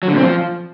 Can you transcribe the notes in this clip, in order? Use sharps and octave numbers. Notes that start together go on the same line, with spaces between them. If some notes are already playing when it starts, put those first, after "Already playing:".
F#3
D3
A#2
C4
F3